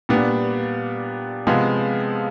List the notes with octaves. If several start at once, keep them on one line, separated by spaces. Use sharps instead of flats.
A#2 G3 B3 D4
C3 F3 G#3 B3